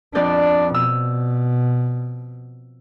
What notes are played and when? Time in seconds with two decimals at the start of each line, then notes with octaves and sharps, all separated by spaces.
0.15 F2 D4 D5 G6
0.74 B2 E6